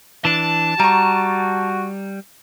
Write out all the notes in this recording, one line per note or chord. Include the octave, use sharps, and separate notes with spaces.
E3 D4 A5
G3 F#4 A#5 C#6